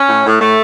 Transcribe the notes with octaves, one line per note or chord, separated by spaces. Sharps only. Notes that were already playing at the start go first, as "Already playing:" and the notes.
Already playing: C#4
A2
A2
A2 A3